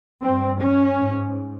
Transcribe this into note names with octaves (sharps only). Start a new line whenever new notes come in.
G2 C4
C#4
G#2